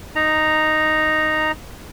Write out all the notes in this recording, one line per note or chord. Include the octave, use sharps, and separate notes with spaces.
D#4 A#5